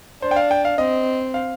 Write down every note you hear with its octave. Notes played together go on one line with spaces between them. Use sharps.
D4 C5
G5
F5
G5
F5
C4 D#5
F5